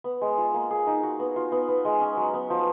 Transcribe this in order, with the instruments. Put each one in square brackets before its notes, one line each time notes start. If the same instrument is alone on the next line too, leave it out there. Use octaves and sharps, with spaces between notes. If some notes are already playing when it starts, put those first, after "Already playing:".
[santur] B3
G#3
F4
A#3
G#4
D#4
F#4
B3
F4
B3
B3
G#3
C#4
F#3
B3
F3